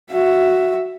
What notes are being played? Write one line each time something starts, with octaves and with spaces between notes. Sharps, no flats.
F#4 E5